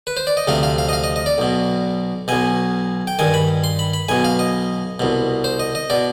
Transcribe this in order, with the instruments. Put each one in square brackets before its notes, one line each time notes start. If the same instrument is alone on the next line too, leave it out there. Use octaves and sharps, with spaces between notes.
[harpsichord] B4
C5
D5
D#5
D2 C3 F3 F5
F5
F5
D#5
F5
D#5
D#5
D5
B1 B2
B1 B2 G#5
G5
G2 D#3 G#5
B5
C6
B5
B5
B1 B2 G#5
F5
D#5
C2 B2
C5
D#5
D#5
B2 D5